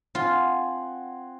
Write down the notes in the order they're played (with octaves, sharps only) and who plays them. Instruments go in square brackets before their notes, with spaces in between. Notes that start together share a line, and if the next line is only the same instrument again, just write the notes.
[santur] C4 F#5 G#5 [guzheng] F4